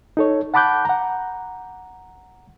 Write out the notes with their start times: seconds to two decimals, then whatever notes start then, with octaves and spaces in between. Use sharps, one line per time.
0.17 D#4 A4 C#5
0.54 F#5 A5 B5 D6 F#6 G6
0.85 F#5 A#5